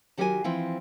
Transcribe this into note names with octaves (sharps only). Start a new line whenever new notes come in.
D#3 F#3 G4 A#4 C#5 G#5
E3 F3 C4 E4